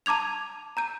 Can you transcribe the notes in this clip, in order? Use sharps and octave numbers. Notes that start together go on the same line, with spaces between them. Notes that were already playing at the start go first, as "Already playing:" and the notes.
A5 A#5 D6 G#6 F7
A#5 G6 D#7